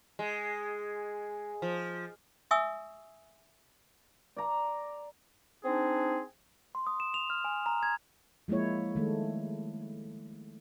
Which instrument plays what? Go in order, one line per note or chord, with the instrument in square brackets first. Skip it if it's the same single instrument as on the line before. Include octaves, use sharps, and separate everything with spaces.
[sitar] G#3
F3
[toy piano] E5 G#5 C#6 D#6 E6
[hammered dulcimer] D5 A#5
[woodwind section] C4 D4 D#4 G#4
[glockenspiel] C6
D#6
E7
F7
F6
G#5
A#5
G#6
[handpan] F3 G#3 A#3 E4 C#5
D#3 G#3 A3